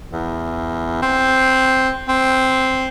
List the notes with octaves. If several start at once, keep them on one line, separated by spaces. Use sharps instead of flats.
E2
C4
C4